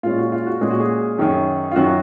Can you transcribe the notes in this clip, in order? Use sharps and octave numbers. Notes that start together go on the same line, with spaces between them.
A#2 G#3 C#4 F4
F#4
F4
F#4
A#2 G#3 C#4 G#4
F#4
G#4
F#2 D#3 F#3 C#4
F4
F#2 D#3 F#3 C#4 F#4